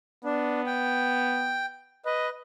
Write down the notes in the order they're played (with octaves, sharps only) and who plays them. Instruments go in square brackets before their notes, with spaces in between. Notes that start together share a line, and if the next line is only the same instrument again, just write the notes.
[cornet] B3 [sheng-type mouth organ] D4
[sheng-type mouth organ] G5
[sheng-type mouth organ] B4 [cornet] D#5